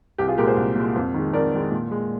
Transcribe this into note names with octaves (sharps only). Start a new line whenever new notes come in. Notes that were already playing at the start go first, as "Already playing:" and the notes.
C2 G4
F4 G#4
A#2 G#3 G4 A#4
G#4 C5
C2
A#2 G#3
F2
D#3 G#3
F2 A#4 D5
D#3 G#3
A#2
G#3